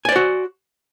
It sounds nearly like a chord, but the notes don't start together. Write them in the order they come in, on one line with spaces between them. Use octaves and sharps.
G#5 D5 C5 F#4